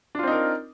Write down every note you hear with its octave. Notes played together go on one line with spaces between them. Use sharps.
C4 D4 D#4 F4 A#4